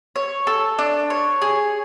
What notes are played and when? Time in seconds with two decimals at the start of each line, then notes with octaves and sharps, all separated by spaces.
0.16 C#5
0.47 A4
0.79 D4
1.10 C#5
1.42 G#4